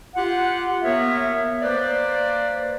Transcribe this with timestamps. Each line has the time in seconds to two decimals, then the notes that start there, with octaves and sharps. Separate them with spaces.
0.15 F4 G4 F#5
0.82 A#3 B3 A#4 C#5 E5
1.62 A#3 B4 C5 D5